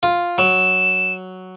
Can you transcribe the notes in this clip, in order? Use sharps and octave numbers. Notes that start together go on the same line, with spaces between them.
F4
F#3 E7